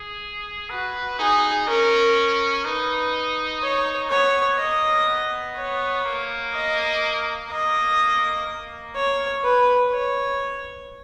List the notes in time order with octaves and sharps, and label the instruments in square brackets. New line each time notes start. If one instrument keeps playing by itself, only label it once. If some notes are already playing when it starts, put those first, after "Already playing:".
Already playing: [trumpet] G#4
[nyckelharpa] F#4 [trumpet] B4
[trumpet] D#4 [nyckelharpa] G#4
[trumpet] C#4 [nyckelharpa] A#4
[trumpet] D#4 [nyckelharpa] B4
[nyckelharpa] C#5
[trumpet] B3 [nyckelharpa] C#5
[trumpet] A#3 [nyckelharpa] D#5
[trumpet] B3
[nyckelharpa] C#5
[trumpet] A#3
[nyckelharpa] D#5
[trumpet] A#3 [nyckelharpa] D#5
[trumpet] A#3
[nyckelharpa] C#5
B4
C#5